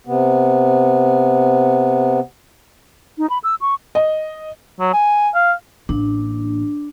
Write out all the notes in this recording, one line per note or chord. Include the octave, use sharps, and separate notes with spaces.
C3 B3
D#4
B5
E6
C#6
D#5
F#3
G#5
F5
A1 A#3 D4